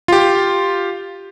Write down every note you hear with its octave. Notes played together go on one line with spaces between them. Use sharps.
F4 G4